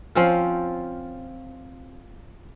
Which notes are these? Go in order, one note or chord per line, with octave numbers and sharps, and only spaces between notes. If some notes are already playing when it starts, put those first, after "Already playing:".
F3 C4 C#4 F4